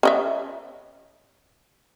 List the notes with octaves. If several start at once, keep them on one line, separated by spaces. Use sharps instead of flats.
C#4 D#5 E5